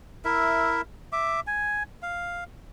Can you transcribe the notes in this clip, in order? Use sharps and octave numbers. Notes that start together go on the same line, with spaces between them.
E4 A#4 E5
E5 D6
G#5
F5